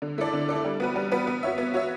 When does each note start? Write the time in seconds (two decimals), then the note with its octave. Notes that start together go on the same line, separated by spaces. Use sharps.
0.02 D3
0.18 A3 E4 A4 D5
0.33 D3
0.49 A3 E4 A4 D5
0.65 G3
0.80 B3 F#4 B4
0.96 G3
1.12 B3 F#4 B4
1.27 B3
1.43 F#4 C#5 E5
1.58 B3
1.74 F#4 C#5 E5